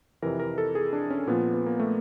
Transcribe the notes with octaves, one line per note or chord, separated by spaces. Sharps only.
F2 C3 E3 A#4
A#4
A4
G#4
D4
C#4
A#2 F3 B3
B3
A#3
A3